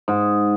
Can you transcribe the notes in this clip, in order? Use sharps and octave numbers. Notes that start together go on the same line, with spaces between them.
G#2